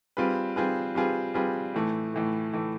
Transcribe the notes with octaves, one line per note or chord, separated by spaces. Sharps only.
G3 C4 F4 G#4 B4
G3 C4 F4 G#4 B4
G3 C4 F4 G#4 B4
G3 C4 F4 G#4 B4
A2 E3 A3
A2 E3 A3
A2 E3 A3